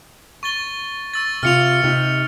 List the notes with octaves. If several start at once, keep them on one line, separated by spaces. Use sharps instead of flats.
C#6 A6 G7
C#6 E6 A6
C3 F4 F6 C#7 F7
C3 D#4